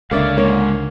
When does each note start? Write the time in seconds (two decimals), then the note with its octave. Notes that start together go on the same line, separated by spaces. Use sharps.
0.11 C#2 D3 A#3 C#5 D5 E5 F5
0.37 G#2 C#3 A#3 C#5